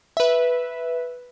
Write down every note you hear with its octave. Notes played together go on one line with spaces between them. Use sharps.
B4 E5